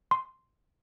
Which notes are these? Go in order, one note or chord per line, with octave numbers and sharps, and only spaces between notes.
C6